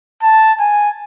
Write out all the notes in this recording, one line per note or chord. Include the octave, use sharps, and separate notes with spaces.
A5
G#5